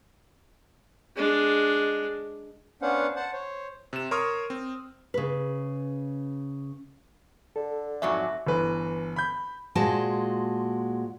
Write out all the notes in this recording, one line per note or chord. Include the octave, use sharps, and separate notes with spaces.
G#3 D4
B3 C#4 D4 C5 F5 F#5
C5 F#5 A5
C5 C#5
C3 E7
A#4 C#5 C6 C#6 D#6 F6
C4
C#3 B4
D3 A4
F2 G#2 F#3 E5 G#5 C#6 D6
G1 E3 B4
B5 G6
A#2 G#3 F#4 C5 A5